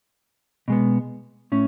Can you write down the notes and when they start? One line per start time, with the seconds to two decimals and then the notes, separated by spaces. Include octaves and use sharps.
0.68 B2 G#3 B3
1.52 A2 C#4